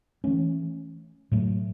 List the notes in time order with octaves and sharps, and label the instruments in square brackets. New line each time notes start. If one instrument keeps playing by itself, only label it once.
[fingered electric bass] E3 A3 C#4
A2 F#3 A3